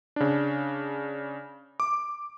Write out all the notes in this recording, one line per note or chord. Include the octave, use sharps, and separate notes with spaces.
C#3 D4
D6